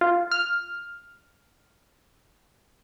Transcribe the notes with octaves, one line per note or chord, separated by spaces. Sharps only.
F4
F6